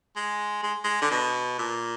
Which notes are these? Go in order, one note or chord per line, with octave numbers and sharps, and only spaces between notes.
G#3
G#3
G#3
D3
B2
A#2